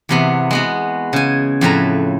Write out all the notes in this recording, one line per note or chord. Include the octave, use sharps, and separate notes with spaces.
E2 C3 B3
G#3 B3 F#4
C#3 G#5
F2 A2 B4 A#5